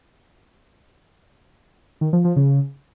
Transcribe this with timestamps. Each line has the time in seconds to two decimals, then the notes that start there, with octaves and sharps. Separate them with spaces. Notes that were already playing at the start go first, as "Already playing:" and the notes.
2.01 D#3
2.13 F3
2.25 F3
2.36 C#3